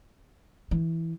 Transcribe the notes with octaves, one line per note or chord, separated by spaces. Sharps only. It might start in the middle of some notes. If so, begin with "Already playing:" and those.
E3